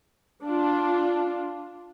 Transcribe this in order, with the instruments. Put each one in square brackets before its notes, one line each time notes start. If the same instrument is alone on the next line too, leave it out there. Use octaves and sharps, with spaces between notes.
[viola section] D4 F4